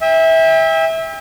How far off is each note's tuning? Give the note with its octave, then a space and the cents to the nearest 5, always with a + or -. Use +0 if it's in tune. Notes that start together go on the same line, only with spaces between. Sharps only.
E5 -20 G5 +40